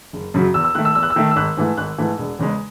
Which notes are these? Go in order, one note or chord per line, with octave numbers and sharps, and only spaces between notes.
F#1
F#2 C#3 F#3
E2 E6
E6
D#3 A3 F#6
E6
E2 E6
F#6
E6
D#3 A3
E6
G#1 F#6
G#2 E3 A3
G#1 F#6
G#2 E3 A3
E1
E2 C#3 G#3